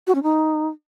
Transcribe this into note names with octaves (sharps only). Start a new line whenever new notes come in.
F#4
C#4
D#4